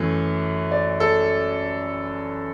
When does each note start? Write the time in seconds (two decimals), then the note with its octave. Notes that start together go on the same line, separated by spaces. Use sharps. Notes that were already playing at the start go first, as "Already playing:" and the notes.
Already playing: F#2 E3 A3
0.71 D5
1.00 A4